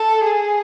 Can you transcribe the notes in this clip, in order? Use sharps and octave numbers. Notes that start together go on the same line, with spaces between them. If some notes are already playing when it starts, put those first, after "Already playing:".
Already playing: A4
G#4